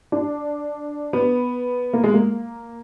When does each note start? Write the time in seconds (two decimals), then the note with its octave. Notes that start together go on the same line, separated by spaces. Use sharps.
0.12 D4
1.13 B3
1.93 A#3
2.04 G#3
2.14 A#3